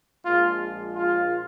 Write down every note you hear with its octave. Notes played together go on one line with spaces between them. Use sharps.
A#1 A#2 F3 G#3 F4
F4